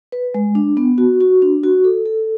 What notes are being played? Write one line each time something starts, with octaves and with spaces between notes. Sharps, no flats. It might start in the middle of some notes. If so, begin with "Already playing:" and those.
B4
G#3
D4
B3
F#4
F#4
D4
F#4
A4
A4